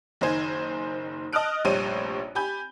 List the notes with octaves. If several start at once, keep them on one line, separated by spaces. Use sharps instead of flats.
F#1 D#3 D#4 C5 G#5 G#6
D#5 A5 D#6 F6 F#6 D7
F1 A#1 G3 C5 C#5 D#7
G4 G#5 B5 G6